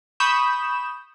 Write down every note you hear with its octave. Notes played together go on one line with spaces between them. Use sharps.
B5 C#6 D#6 G6 E7